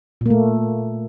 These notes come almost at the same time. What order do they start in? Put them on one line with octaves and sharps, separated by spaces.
A#2 A#3 A3